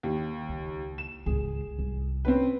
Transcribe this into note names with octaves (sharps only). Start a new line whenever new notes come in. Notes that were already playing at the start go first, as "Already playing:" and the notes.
D#2
C#2
E7
C#2 G#2 G#4
C2
C4 C#4 B4